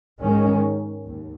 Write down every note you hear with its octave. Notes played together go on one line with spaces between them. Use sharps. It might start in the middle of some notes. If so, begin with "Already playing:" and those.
G#2 D#3 G#3 C#4
D#2